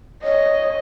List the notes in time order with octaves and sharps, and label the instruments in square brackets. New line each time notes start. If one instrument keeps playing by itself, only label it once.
[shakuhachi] C#5 [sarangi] D#5